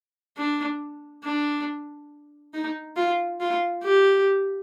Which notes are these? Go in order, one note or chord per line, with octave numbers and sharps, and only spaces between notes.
D4
D4
D#4
F4
F4
G4